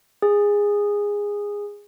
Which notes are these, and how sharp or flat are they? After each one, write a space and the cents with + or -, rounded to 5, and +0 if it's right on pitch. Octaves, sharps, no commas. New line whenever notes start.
G#4 -15